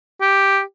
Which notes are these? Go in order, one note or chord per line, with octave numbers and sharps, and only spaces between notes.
G4